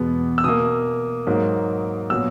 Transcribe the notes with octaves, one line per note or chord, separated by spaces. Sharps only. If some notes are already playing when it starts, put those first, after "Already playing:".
Already playing: E2 B2 G#3 B3
E6
B2 A#3 D#6
G#2 F#3 A#3
A#2 F#3 B3 E6